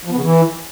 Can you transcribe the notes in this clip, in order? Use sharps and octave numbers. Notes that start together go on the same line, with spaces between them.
F3
B3
C#3
E3